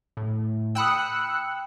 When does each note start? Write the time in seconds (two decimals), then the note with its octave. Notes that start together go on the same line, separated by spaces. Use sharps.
0.17 A2
0.75 G5 B5 D#6 E6 F#6 C#7